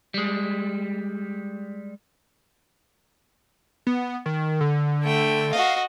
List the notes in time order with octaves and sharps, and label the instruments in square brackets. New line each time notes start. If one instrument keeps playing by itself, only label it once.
[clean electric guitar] G3 G#3
[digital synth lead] B3
D#3
D3
[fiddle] A3 G5
[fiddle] F#4 D#5 [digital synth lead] F5